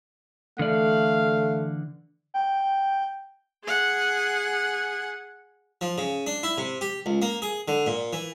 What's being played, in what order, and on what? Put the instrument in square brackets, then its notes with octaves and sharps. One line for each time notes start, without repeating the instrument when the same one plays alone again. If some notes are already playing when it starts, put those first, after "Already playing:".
[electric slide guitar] D3 E3 D5 [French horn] A3 [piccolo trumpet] F5
[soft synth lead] G5
[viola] G#4 F#5
[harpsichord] F3
C#3
D4
E4
C3
G4
C#2
A#3
G#4
D3
A#2
E3